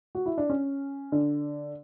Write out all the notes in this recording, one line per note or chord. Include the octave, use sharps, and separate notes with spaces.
F#4
E4
D4
C#4
D3